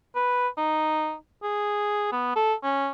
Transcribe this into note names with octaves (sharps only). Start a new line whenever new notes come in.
B4
D#4
G#4
B3
A4
C#4